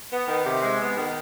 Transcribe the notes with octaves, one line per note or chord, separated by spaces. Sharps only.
B3
D#3
C3
G#3
B3
D#3